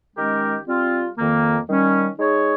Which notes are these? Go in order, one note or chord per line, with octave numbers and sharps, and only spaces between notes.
D#3 G#3 C#4 G4 A#4
G3 C4 F4
F2 D#3 A#3
D#3 G3 C#4
G#3 D#4 G#4 C#5